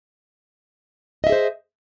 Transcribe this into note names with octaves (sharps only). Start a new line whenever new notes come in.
G#4 C5 D#5 E5